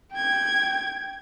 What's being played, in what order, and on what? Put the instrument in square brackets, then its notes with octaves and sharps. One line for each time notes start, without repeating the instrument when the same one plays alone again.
[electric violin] G5 G#6